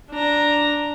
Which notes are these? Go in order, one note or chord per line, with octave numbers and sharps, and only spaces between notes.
D4 A#5